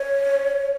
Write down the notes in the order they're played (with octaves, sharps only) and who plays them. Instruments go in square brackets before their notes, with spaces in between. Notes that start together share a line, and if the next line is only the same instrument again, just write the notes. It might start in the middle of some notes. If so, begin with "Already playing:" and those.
Already playing: [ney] C#5